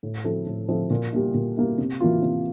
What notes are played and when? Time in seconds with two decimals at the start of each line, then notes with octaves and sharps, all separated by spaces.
0.03 A2
0.24 F3 C4 E4 A4
0.46 A2
0.69 F3 C4 E4 A4
0.90 A#2
1.12 G3 A#3 E4
1.34 A#2
1.57 G3 A#3 E4
1.78 C3
2.01 E3 A#3 F4
2.22 C3